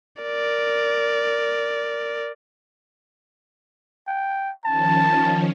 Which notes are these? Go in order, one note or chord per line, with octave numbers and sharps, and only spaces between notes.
A#4 D5
G5
D#3 F3 C#4 A5